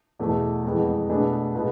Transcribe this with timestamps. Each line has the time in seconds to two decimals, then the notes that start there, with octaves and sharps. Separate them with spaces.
0.19 E2 B2 A3
0.64 F2 E3 G#3 B3
1.09 B2 A3 D4 G#4 B4
1.55 B2 G#3 B3 F4 B4